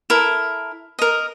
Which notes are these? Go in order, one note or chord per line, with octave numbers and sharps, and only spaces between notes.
E4 A4 A#4
A#4 D#5